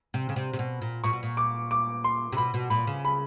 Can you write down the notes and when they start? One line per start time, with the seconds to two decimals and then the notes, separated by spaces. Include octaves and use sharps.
0.14 C3
0.29 C#3
0.36 C3
0.53 C3
0.59 B2
0.81 A#2
1.04 A#2 C#6
1.13 B2
1.23 A#2
1.37 D6
1.71 D6
2.04 C6
2.32 C3
2.37 B2 B5
2.54 B2
2.70 A#2 B5
2.87 C#3
3.05 B5